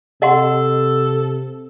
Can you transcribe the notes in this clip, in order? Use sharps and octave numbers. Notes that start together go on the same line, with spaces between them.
C3 A4 D#5 F#5 C6